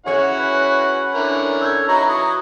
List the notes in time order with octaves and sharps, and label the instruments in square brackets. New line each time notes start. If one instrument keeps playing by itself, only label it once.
[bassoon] C#4 [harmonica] E4 F#4 F#5 [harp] G#4 C#5
[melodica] B4
[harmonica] D3 E4 A#4
[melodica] A4 [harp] E6 G6 G#6
[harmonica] F#3 E4 B4 [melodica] D#4 C#5 A#5
[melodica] C#6 D#6